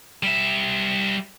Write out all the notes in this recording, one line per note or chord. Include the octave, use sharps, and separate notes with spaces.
G3 E5